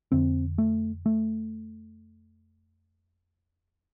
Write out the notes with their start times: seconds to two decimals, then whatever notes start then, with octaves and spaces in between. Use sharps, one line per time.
0.12 F2 D3 C4
0.58 A3
1.06 A3